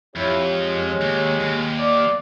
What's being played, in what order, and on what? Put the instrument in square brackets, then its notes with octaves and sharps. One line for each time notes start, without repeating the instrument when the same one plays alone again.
[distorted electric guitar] F2 [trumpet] E4 [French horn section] G4 C#5
[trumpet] G#3
[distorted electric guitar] D#2
D#2
[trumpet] D5